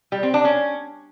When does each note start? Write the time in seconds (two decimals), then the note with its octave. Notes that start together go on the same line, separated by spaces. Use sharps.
0.12 G3
0.23 C4
0.34 D4
0.45 C#4